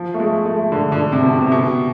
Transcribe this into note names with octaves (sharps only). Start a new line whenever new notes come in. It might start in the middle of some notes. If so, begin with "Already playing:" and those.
Already playing: F3
A3
G#3
A3
D3
D3
C3
B2
C3
C3
B2